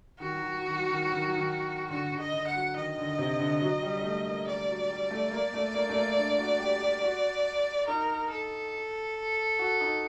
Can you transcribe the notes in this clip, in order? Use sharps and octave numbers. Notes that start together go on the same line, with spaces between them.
D#3 F#4
F#3
D#3
F#3
D#3
F#3
D#3
F#3
D#3
F#3
D#3
D3 F#4
D3
D#5
D3
F#5
F#3
D#3 D#5
D3
C3
D3
F#3
G3
G3
A3
A#3
G3 D5
F#3
G3
A3
A#3
A3
A#3
A3
A#3
D4
F#4
G4
G4
F#4
D#4 A#4
A4
F#4
D#4